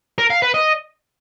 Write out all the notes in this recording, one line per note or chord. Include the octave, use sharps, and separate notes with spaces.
A#4
F5
B4
D#5